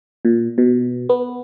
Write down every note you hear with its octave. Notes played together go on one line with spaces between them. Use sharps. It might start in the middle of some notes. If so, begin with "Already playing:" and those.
A#2
B2
B3